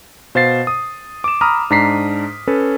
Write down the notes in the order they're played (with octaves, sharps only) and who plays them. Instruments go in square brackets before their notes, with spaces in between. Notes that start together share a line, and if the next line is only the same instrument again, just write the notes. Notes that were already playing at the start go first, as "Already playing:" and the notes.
[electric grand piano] B2 C5 F5 A6 C7
D#6
D6 E7
A#5 B5 D#6 F6
G#2 D4 A#5 B6 C7
C#4 A4 B4